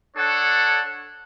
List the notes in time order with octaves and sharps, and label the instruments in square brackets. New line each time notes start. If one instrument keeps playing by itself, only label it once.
[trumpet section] D4 A4 C#5 F#5